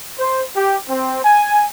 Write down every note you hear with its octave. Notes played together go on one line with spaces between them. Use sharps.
C5
G4
C4
G#5